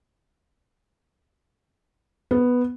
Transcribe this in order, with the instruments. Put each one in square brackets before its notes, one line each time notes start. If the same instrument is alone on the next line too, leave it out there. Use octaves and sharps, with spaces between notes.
[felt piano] B3